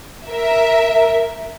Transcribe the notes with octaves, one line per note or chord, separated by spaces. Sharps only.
A#4 E5